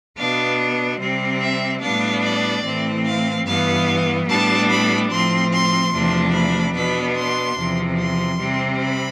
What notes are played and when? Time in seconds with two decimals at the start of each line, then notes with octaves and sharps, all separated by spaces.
0.17 B2 B3 D4 F5
1.00 C3 G3 C4
1.41 E5
1.81 A2 G3 B3 D4 F5
2.23 D5
2.64 A2 E3 A3 C4
3.05 F5
3.46 G2 E3 B3 F5
4.28 A2 G3 B3 D4 A5
4.70 B5
5.10 A2 F3 C4 C6
5.52 C6
5.93 E2 C3 F3 A3 D4
6.34 B5
6.75 B2 B3 D4 B5
7.16 C6
7.57 E2 C3 F3
7.98 C6
8.39 C3 G3 C4
8.81 B5